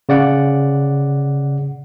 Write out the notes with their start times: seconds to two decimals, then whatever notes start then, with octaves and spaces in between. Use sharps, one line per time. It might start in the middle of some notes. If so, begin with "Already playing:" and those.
0.09 C#3 D5 F#5